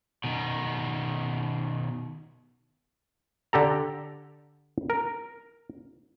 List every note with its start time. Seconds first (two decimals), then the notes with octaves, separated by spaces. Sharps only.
0.24 B2 D#3
3.53 D3 G4 A4 A#5
4.90 A#4